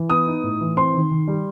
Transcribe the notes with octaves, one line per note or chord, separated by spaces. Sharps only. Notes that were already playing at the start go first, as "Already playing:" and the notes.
Already playing: E3
B3 D#6
D#4
A2
E3
C4 C6
D#3
D#3
G3